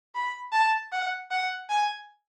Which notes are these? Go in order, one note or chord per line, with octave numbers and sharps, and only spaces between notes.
B5
A5
F#5
F#5
G#5